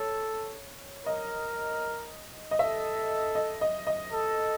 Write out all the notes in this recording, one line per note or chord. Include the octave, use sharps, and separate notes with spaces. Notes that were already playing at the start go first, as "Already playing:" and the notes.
Already playing: A4 C#5
A#4 D#5
D#5
A4 E5
D#5
D#5
D#5
A4